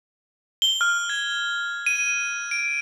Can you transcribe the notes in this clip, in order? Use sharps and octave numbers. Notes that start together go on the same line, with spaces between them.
G7
F6
G#6
D#7
D7